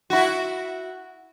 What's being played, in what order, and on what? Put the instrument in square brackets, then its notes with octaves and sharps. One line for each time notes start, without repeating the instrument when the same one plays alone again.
[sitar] E4 F#4